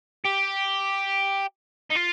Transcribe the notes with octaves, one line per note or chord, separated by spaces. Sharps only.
G4
D#4
F4